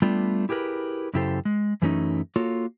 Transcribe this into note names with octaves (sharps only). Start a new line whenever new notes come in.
G3 A3 B3 D4 F4
E4 G4 G#4 A#4 B4
F#2 C#3 E4 G4 A4 C5
G#3
F#2 E3 F#3 A3 C#4 D#4
A#3 F4 F#4 A4 C#5